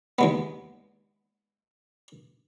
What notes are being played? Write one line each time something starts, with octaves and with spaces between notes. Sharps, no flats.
D#2 G#3 B3